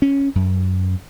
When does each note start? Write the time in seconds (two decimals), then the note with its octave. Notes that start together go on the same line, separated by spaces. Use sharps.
0.02 C#4
0.35 F#2